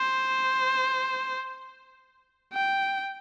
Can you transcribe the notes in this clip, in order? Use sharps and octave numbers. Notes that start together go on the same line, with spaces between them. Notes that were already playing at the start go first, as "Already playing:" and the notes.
Already playing: C5
G5